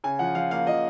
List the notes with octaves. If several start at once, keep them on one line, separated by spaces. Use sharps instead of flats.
C#3 G#5
F3 F#5
F3 F5
A#3 F5
F3 D#5